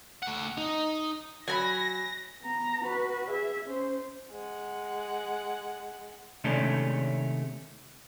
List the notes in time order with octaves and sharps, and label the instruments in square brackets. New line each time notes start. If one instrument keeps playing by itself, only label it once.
[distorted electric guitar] A3 F#5
D#4
[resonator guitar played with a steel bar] F#3 [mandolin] G#5 A#5 B5 [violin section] A#6
[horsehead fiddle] B3 A#5
F#4 B4
G#4 E5
C#4 C5
[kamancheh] G#3 F#5
[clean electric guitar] C3 D#3 G#3 A3 C#4 D4